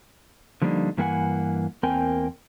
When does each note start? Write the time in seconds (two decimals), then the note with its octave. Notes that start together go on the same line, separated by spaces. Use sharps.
0.62 D3 F3 G3 A#3 D4 D#4
0.97 G2 E3 A#3 G#4 F#5 G#5
1.83 E2 A#3 C4 A#4 G5 G#5